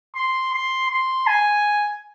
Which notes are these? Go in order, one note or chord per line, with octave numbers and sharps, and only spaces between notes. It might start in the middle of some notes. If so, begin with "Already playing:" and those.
C6
C6
C6
G#5